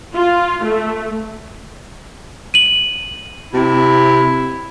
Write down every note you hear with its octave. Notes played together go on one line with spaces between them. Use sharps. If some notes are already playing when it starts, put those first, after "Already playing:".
F4
A3
D#7 F#7
C3 E4